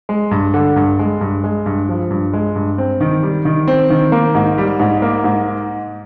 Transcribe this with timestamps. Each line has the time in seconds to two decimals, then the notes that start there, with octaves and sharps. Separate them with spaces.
0.09 G#3
0.31 G2
0.54 D3
0.76 G2
0.99 G#3
1.21 G2
1.44 G#3
1.66 G2
1.89 F3
2.11 G2
2.33 G#3
2.55 G2
2.78 C4
3.01 D#3
3.23 G3
3.45 D#3
3.68 C4
3.90 D#3
4.12 A#3
4.35 G#2
4.58 G3
4.80 G#2
5.02 A#3
5.24 G#2